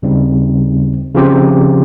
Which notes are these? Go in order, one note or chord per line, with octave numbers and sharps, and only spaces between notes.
D#2 C#3 G3 C4 D#4
C#3 F3 C4 G4 C5